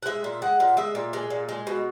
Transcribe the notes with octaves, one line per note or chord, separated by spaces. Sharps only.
F#5
G#3 E5
A#2
G#3 F#5
A#2
G#3 E5
A#2
G#3
A#2
G#3
B2